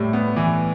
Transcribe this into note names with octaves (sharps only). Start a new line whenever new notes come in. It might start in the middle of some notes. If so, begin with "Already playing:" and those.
Already playing: A2 G3
B3
E3